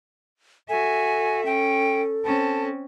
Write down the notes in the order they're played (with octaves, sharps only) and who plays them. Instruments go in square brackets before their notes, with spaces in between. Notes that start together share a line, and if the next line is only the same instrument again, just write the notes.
[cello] F#4 E5 [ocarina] A4 [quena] G#5
[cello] C#4 [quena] G5
[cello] C4 C#4 [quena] A5